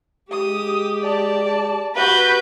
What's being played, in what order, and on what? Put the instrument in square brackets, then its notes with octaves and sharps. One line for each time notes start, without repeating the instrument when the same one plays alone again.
[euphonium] G#3 [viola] G4 [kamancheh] D#6
[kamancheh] D5 A5
[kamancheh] F#4 [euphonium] G4 [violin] B4 G6